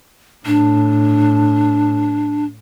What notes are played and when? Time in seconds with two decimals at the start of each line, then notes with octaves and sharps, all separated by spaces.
0.46 A2 D4